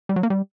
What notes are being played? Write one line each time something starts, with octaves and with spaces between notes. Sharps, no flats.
G3
F#3
A#3
G3